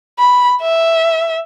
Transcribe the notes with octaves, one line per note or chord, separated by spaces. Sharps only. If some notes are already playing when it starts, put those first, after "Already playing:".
B5
E5